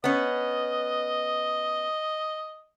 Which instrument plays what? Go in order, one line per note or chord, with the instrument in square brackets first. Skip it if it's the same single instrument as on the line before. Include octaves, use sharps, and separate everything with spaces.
[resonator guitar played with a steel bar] B3 C#4 [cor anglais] D#5